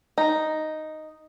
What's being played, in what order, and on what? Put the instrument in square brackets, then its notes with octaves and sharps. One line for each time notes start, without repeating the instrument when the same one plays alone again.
[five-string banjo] D#4